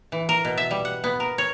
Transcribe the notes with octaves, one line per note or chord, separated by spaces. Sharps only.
E3
A#4
B2
E5
G3
F#5
B3
A#4
C#5